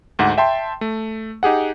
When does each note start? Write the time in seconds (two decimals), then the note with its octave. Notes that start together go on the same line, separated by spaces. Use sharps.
0.19 D2 G#2 F#5
0.38 E5 G5 A5 C6
0.81 A3
1.43 D#4 G4 G#4 F#5